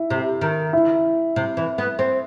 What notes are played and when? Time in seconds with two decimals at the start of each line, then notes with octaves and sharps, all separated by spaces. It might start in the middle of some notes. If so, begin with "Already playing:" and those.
Already playing: E4
0.10 C3
0.41 D#3
0.73 E4
1.36 C3
1.57 E3
1.78 B3
1.99 C4